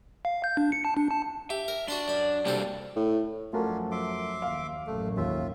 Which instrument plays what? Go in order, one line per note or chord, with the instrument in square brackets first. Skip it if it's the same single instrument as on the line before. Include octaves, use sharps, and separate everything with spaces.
[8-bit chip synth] F5
G6
D4
C#7
A5
D4
A5
[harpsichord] G4 [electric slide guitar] E5
[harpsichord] A#4
[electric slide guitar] D4 [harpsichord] F#4 D5 C6
[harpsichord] F#2 B5 [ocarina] D5
[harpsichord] C3 C4 A4 [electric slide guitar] G3 A#3 D4
[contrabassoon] A2
[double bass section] F#2 F3 [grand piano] A3 F#4 A#4 [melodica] C#4 D4 F4
[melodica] E5 C6 D6
[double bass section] D#2 [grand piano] F5
[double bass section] A1 F#2 [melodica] A3
[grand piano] D#2 [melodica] F4 E5